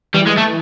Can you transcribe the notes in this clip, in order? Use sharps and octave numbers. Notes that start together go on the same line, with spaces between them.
E3 G3
G#3
A3